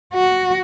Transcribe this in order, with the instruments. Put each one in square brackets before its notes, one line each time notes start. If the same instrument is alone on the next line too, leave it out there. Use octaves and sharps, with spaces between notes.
[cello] F#4